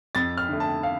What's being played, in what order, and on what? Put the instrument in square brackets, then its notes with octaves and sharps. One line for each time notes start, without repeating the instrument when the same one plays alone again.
[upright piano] F2 A6
F6
D3 A3
A5
F5